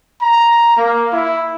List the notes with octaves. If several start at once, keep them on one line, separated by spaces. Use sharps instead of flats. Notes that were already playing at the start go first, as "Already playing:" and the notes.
A#5
A#3
E4